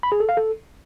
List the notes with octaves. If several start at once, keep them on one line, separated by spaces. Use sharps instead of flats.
B5
G#4
A4
F5
A4